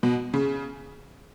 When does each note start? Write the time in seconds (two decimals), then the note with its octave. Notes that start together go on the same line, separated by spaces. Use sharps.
0.03 B2
0.34 C#3